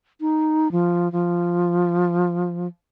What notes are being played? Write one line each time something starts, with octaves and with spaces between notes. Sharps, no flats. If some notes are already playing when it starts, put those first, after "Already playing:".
D#4
F3
F3